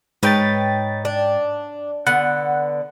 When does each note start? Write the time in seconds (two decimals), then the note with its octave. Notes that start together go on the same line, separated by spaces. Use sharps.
0.23 G#2 D#4 B4 C#5 G5 A6
1.05 D4
2.07 D3 B3 F#5